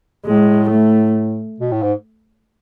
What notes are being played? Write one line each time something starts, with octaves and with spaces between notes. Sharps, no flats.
A2 G#3
A3
B2
A2
G#2